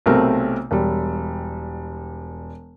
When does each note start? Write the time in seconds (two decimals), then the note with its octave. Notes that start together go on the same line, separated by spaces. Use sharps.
0.06 B1 C3 A3 C4 A#4
0.71 E1 G3